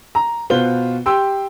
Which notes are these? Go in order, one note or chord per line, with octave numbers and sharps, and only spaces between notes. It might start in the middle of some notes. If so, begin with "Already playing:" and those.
A#5
B2 F4 B4 C5 G7
G4 G5 C6 E6